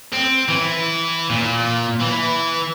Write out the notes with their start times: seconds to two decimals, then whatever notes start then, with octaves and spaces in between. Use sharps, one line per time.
0.13 C4
0.48 E3
1.30 A#2
2.00 E3